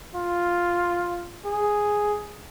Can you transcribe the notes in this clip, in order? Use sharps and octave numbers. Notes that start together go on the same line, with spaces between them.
F4
G#4